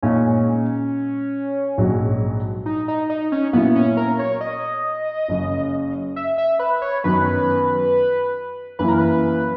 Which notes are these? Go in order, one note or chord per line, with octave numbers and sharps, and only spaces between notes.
A#2 G#3 C#4 D#4
A#1 G#2 F#3
D#4
D#4
D#4
C#4
A#2 F#3 A#3 B3 E4
C#4
A#4
C#5
D#5
F#1 F#2 C#3
E5
E5
B4
C#5
F#2 D#3 F#3 B3 B4
F#2 E3 A#3 E4 B4
A#4
B4